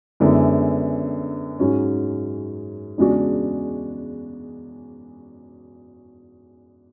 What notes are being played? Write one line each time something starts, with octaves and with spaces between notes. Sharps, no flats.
F#2 D3 G#3 B3 E4
G#2 F#3 C#4
E2 C#3 G#3 D4 F#4